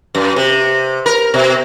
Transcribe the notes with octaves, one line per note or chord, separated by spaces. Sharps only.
F#2
C3
A#4
B2